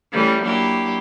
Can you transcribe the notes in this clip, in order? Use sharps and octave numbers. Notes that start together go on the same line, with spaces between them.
E3 G3 A3 C#4
F#3 A#3 D4 E4 G4